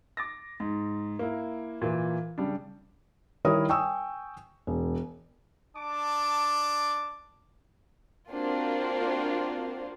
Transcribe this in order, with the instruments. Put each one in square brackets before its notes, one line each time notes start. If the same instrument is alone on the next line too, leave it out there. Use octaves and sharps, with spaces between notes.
[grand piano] D6 A6 A#6
G#2
A#3 E4
A#2 E3
C#3 G3 D4
[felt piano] D#3 G3 E4 A#4 C#5 D#6
G5 G#5 C#6 D#6 E6
E1
[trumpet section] D4 A5 D6
[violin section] A#3 C4 D4 F4 F#4 C5